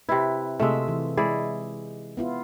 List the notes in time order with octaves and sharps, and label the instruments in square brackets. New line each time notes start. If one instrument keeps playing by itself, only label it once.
[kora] C3 E4 [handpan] B4
[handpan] C3 F4 E5 [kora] G#3 A3
[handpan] E3
[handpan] G#3 [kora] E4 G#4 D5
[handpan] B3 E4 F4